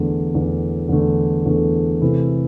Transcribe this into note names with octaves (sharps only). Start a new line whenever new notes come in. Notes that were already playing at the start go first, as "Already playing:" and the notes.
Already playing: E2 D3 A3
E2 D3 A3
E2 D3 A3
E2 D3 A3
C3 E3 A3 E4 A4